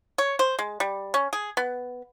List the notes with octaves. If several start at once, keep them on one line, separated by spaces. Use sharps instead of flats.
C#5
C5
G#3
G3
C#4
G#4
B3